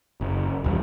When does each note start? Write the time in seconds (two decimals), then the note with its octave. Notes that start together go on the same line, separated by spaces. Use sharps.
0.21 F#1
0.64 D#1 E2 G3